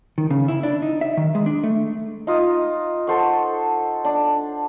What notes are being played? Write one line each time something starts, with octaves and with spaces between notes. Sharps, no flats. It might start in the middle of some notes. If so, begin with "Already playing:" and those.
D#3
C#3
E4
D4
D#4
E5
D#3
G#3
D4
A3
D#4 F4 D#6
A4 C5 F#5 C#6
D4